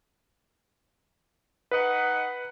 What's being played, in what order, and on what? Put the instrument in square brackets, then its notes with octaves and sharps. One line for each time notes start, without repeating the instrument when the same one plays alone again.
[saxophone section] D#4 D#5 F#5 [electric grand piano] B4